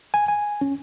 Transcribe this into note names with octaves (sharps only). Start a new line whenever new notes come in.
G#5
G#5
C#4